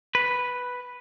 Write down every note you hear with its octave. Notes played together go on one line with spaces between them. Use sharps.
B4